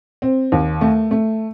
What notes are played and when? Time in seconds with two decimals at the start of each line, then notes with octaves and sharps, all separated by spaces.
0.22 C4
0.52 D#2
0.81 A3
1.11 A3